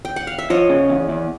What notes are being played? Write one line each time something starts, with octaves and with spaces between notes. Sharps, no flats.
G5
F#5
F5
E5
F3 C#5 D#5
C#3
E2
E2